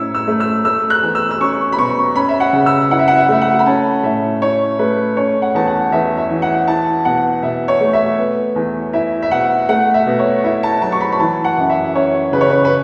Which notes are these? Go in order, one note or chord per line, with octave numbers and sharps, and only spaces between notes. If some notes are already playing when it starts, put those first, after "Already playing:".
Already playing: A2 C#4 E4 C#5 E6
E6
A3
E6
A3 E6
F#6
E2
E6
E6
C#4 C#6
B5
B2 C#6
C#4 B5
E5
F#5
C#3
E6
E4 F#5
E5
F#5
E5
A3 E5
F#5
B5
C#4 A5
A2 E5
E4 C#5
A3 B4
C#4 C#5
F#5
E2 A5
F#5
E2 E5
E5
E3
F#5
E4 A5
B2 F#5
B2 E5
C#5
A3
E5
B3
E2
E4 E5
E5
B2 F#5
A3 F#5
E5
B2
C#5
E4 E5
A5
F#3 A5
C#6
B5
B5
E3 A5
F#5
F#2
E5
C#4 C#5
C#3 B4
C#5
B4
B4